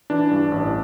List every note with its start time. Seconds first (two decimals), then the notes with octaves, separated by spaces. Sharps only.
0.10 E3 D4
0.31 G2
0.52 A1